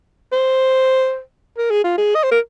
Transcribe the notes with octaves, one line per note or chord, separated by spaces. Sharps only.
C5
A#4
G#4
F4
G#4
D#5
C5
A#4